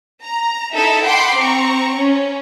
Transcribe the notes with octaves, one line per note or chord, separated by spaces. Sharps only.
A#5
D#4 E4 A4 E5
F#5 G5 B5 C6 D6 C7
C4 A#5 C#6
C#4